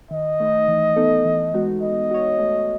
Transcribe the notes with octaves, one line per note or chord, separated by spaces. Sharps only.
D#3 D#5
A3 D#4
E3
B3 D#4 A4
E3
G#3 B3 D#4 F#4
B3 D#5
F#4 C#5
A3